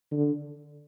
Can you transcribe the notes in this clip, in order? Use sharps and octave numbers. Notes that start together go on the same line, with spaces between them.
D3